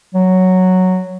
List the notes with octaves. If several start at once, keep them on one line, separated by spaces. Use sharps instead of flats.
F#3